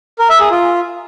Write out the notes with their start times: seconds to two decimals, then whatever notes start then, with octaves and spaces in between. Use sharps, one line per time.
0.19 A#4
0.30 E5
0.40 G#4
0.51 F4